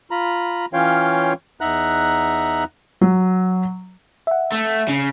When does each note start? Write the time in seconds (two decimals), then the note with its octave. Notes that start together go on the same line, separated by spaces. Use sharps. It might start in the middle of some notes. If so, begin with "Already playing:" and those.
0.11 F4 A#5 B5
0.73 E3 C#4 F4 C#5 F5 G5
1.61 E2 D#4 E5 F#5 A#5 F#6
3.01 F#3
4.27 E5 F#5
4.52 A3
4.88 C#3